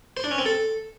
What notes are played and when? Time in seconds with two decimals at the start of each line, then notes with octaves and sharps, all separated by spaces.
0.17 C5
0.24 D4
0.31 C#4
0.38 C4
0.46 A4